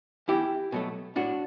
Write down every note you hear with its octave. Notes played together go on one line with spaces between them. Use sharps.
E2 E4 G4
B2 F#3 A3
A2 D4 F#4